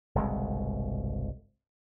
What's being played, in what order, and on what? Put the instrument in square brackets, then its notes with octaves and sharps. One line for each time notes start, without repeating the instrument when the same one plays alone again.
[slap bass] G1 C2 B2 G#3